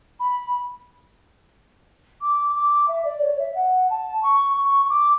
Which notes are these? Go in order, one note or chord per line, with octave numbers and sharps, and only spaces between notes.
B5
D6
D6
E5
D5
C#5
E5
F#5
A5
C#6
C#6
C#6
D6